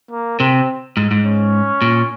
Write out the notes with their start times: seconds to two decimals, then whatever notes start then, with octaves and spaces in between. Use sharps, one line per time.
0.11 A#3
0.40 C3 C4
0.97 G#2
1.11 G#2
1.25 C#4
1.82 A#2